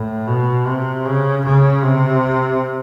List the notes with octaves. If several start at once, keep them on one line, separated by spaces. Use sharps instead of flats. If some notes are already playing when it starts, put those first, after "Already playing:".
Already playing: A2
B2
C3
C#3
C#3
C3